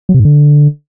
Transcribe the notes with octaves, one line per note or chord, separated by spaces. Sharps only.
F#3
C3
G#2
D3